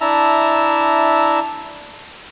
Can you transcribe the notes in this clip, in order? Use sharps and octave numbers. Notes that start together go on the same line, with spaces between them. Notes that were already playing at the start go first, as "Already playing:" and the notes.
D4 E4 E5 A5 A#5